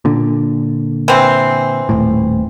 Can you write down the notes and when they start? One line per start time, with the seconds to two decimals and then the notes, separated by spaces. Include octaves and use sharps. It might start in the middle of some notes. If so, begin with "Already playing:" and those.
0.05 A#2 D3
1.08 E3 C4
1.89 D#1 A2